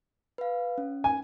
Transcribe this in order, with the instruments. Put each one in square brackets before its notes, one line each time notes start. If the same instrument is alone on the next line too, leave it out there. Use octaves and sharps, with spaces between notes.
[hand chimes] B4 F5
C#4
[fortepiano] G#5